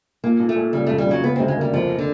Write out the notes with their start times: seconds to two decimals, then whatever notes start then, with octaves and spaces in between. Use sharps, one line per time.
0.24 A#2 A#3
0.40 A#2
0.49 A3
0.56 A#2
0.73 C#3 G3
0.87 F1 A3
0.98 G3
1.07 C#3 F#3
1.23 C#3 B3
1.36 D2 C4
1.48 G#3
1.57 G3 A#3
1.73 F1 F3
1.99 D3